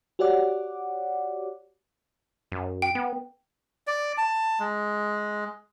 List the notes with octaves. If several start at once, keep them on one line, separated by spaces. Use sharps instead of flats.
F#4 G4 C#5 D5 F#5 D6
F#2
G5
B3
D5
A5
G#3